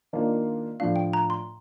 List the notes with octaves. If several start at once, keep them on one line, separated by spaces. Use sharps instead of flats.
D#3 A#3 D4 F4
A2 F3 A3 D4 F4 F5
G5
A#5
C6